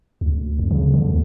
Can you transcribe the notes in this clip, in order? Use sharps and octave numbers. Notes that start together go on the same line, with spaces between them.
D2
F2
C#3
D3
D#2